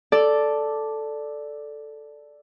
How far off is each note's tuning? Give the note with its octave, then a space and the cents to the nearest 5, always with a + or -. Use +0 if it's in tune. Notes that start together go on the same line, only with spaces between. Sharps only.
A4 +0 D5 +0